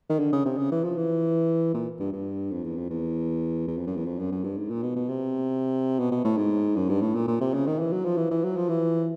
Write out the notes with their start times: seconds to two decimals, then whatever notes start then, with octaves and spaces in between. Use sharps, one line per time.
0.09 D#3
0.19 D3
0.32 C#3
0.45 C3
0.58 C#3
0.71 E3
0.84 F3
0.97 E3
1.74 A#2
2.00 G2
2.13 G2
2.51 F2
2.64 E2
2.77 F2
2.90 E2
3.67 E2
3.77 F2
3.87 F#2
3.96 E2
4.06 F2
4.19 F#2
4.31 F#2
4.44 G2
4.57 G#2
4.70 A#2
4.83 B2
4.96 B2
5.09 C3
5.99 B2
6.11 B2
6.25 A2
6.37 G#2
6.76 F#2
6.89 G2
7.01 A2
7.15 A#2
7.27 A#2
7.40 C3
7.54 C#3
7.67 D#3
7.79 E3
7.92 F#3
8.05 F3
8.17 E3
8.31 E3
8.44 F#3
8.56 F3
8.69 E3